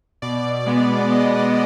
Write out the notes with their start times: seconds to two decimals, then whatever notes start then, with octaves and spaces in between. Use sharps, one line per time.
0.22 B2 D5
0.66 G#3 B3
1.11 B2 D#5